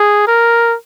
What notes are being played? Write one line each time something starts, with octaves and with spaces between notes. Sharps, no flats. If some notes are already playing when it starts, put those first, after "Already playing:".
Already playing: G#4
A#4